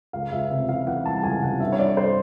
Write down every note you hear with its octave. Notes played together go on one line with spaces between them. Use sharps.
C#2 F5
C#2 E5
C3 E5
E3 F5
E3 F#5
G3 A5
C#2 G#5
C3 F#5
G2 E5
C#5
G2 D5
C5